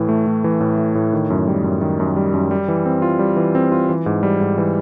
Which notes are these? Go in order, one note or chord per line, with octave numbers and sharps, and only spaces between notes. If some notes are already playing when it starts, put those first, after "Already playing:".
Already playing: A2 E3
A3
A2
E3
A2
A3
A2
D#3
F#2
G3
F#2
D#3
F#2
G3
F#2
G3
E3
C4
F4
G3
E3
C4
F4
E3
G#2
G3
G#2
E3